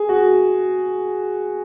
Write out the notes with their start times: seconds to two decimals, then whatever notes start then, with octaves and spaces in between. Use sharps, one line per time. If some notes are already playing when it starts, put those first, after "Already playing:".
Already playing: G#4
0.09 F#4